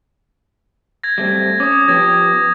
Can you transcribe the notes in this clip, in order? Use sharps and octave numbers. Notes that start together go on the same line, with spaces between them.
G#6 A#6
G3 A3 C4
C#4 D6 D#6
F3 B3 G4 G#6 A#6